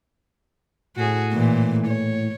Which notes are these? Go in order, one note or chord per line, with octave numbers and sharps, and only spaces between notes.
A2 F#4 G#4
A#2 E3
C#5